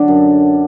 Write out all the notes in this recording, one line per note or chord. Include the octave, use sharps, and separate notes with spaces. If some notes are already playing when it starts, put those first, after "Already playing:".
Already playing: D3 F#3 D4 D5
F#2